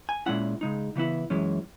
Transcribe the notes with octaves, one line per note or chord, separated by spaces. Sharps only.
G#5
A#2 G#3 C#4 E4 F#5
C#3 G#3 D#4
C#3 E3 B3 E4
F#2 E3 G#3 C#4